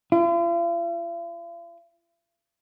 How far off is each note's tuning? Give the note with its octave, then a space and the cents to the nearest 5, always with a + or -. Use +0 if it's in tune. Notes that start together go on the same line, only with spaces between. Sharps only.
F4 -45